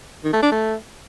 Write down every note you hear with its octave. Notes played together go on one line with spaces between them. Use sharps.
D#3
A3
D4
A3